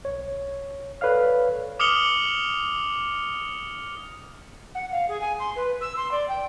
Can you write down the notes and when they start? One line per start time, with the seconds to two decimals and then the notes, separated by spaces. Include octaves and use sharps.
0.05 B1 C#5
1.01 A4 B4 C#5 D5 F5 F6
1.80 D6 D#6 F6 C#7 F7 G7
4.75 F#5
4.91 F5
5.08 G#4
5.21 G#5
5.39 C6
5.56 B4
5.81 E6
5.97 C6
6.11 D5
6.28 G5